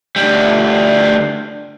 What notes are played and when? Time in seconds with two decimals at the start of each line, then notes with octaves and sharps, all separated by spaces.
0.16 D2 G3